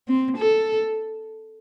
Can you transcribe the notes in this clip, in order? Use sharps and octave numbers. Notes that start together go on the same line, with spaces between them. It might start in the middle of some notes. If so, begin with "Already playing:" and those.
C4
A4